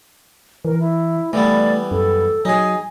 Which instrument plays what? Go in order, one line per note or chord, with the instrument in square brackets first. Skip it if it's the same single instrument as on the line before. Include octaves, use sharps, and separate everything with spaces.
[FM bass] E3 [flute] A#4
[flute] E4
[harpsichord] E3 G3 B3 [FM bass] A3 [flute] D5
[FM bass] F#2 [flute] A4
[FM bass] F#3 [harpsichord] D#4 G#4 [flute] G#5